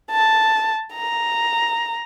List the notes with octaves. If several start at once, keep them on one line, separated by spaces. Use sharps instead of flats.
A5
A#5